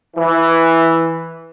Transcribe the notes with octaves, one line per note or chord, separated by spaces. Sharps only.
E3